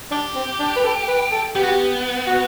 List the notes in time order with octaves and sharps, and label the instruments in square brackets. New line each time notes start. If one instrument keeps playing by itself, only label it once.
[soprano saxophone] D4 [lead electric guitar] G4
[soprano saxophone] C4
D4
B4
A4
B4
A4
[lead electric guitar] B3 [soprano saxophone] G4
[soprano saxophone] F#4
G4
F#4